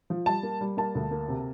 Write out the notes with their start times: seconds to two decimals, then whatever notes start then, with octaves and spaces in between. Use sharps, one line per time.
0.10 F3
0.26 G3 A5
0.43 A#3
0.61 G3
0.77 A#3 A5
0.95 D2
1.11 A#3
1.28 C3